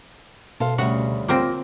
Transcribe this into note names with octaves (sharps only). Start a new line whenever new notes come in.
B2 A4 C5 F5
D2 C#3 G3 F#4
A#3 C4 F4 A#6